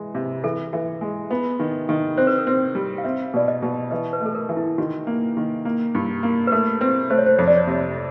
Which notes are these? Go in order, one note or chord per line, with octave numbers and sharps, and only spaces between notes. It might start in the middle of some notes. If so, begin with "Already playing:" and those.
Already playing: E3 G#3
C3
E3 A4
E3
G#3
B3
D#3
D#3
C4 C5
B4
A#4
C4 B4
G3
F5
C4 E5
B2 D5
D#5
B2
E3 D#5
B4
A3 A4
A#4
E3
E4
D#3 F#4
A#3
D#3
A#3
G2
A#3
B4
A3 A#4
C4 B4
A3 C5
C#5
C5
F2 C#5
D5
C#5
C3